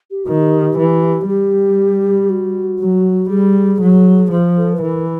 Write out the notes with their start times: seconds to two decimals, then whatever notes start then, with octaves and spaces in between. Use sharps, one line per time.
0.11 G4
0.24 D#3 F#4
0.38 G4
0.78 E3
1.28 G3 G4
2.29 F#4
2.80 F#3
3.30 G3 G#4
3.81 F#3
4.31 F3
4.57 A4
4.74 B4
4.82 E3 A#4